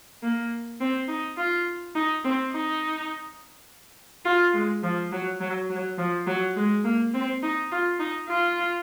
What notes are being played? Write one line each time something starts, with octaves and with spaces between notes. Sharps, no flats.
A#3
C4
D#4
F4
D#4
C4
D#4
F4
G#3
F3
F#3
F#3
F#3
F3
F#3
G#3
A#3
C4
D#4
F4
D#4
F4